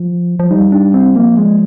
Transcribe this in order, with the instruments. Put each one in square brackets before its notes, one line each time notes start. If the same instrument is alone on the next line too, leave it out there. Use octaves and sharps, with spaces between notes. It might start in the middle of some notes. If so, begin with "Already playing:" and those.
Already playing: [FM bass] F3
F3
[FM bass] G3 [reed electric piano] D#4
[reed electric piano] D4
C4
[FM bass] F3 [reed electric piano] A#3
[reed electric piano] G#3